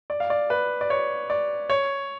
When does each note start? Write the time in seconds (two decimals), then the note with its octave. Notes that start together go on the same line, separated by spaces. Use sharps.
0.10 D5
0.20 F5
0.30 D5
0.50 B4
0.81 D5
0.90 C#5
1.30 D5
1.70 C#5